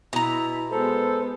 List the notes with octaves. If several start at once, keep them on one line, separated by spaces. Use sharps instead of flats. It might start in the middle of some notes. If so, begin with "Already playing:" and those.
B2 E4 A#5
G#3 B3 A4 C5